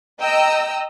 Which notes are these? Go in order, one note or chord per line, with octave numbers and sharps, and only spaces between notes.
D#5 G5 A#5 E6